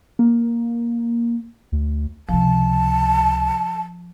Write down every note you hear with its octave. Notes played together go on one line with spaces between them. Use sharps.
A#3
D2
C#2 C3 F3 A5